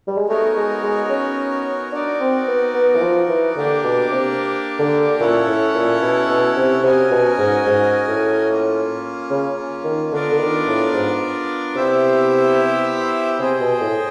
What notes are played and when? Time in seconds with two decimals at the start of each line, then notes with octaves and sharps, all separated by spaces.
0.07 G3
0.18 G#3
0.29 A3 B3 D#4 F#4 A#4 C#5
0.57 G#3
0.83 G#3
1.10 C#4
1.92 D4 D#4 F#4 A#4 D5
2.20 C4
2.48 B3
2.75 B3
2.96 E3
3.02 F3
3.29 E3
3.56 D3 A#3 D4 G4 A#4 D5
3.84 B2
4.11 C3
4.79 D3
5.20 A#2 C#4 E4 A4 C#5 F#5
5.47 A2
5.75 A#2
6.02 B2
6.30 B2
6.57 C3
6.84 C3 C#4 F#4 A#4 D#5 G#5
7.11 B2
7.39 G#2
7.67 G#2
8.08 A2
8.48 A#3 C#4 F4
9.30 C#3
9.84 D#3
10.12 D3 B3 D4 F4 A#4 D5
10.32 D3
10.40 D#3
10.67 A2
10.93 G#2
11.75 C3 B3 E4 G4 C5 E5
13.39 C3 G#4 C5 D#5 G5
13.60 B2
13.81 A2